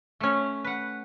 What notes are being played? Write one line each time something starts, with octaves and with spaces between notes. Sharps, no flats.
A3 C#4
B4 F#5